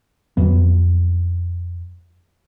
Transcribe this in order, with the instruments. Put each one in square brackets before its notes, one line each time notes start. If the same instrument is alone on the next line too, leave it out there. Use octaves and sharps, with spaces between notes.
[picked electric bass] F2 F#3 B3